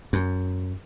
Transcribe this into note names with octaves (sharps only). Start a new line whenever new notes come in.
F#2